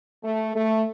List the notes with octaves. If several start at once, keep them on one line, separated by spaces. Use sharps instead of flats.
A3
A3